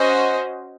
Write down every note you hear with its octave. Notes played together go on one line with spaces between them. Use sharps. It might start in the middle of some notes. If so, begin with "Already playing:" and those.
Already playing: C#4 F#4 C5 D#5